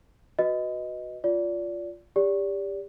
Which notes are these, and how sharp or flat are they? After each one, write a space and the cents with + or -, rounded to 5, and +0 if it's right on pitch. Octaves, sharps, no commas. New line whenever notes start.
F#4 +0 B4 +0 D#5 +0
F4 +0 D5 -25
G4 +25 D5 -30